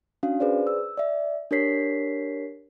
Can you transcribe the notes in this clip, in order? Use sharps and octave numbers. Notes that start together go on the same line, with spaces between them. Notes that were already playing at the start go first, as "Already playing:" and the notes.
C#4 D4 F#4 F5
G#4 B4 C5 D5
E6
D5 E5
D4 G4 A#4 C#5 B6 C7